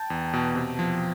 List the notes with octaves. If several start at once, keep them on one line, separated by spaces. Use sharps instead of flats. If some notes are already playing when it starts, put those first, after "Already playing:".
Already playing: G5 A5
E2
B2
C3
F3